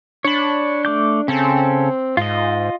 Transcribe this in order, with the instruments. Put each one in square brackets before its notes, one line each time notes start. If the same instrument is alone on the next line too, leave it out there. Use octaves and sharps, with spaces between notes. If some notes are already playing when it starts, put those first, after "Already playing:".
[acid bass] D4 [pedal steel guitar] C#5 B5
[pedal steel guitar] A3 D6 G6
[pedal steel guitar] C#3 C#4 A4 [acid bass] C4
[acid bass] G#2 [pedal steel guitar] F4 D#5